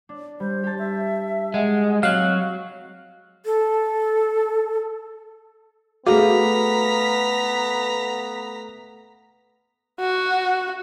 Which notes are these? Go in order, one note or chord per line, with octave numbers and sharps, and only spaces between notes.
D4
G3 C5
G4 A5
E5
G#3 F#5
F#3 C4 F5 F#6
A4
A3 B3 F#4 G#4 F5 A#5 B6
F#4